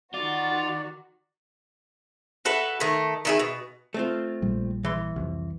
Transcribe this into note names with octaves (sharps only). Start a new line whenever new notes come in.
D#3 F4 F#4 D5
F#4 A4 B4 E5
D#3 A3
D#3 E4 G#4
B2
A3 C4 F4
A#1 A#2 G3
E3 C6
C2 F2